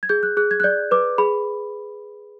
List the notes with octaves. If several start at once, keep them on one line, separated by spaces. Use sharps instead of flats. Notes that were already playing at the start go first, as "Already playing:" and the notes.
G#6
G#4 G6
F#6
G#4 F#6
G#6
F#6
D5 G6
B4 D6
G#4 B5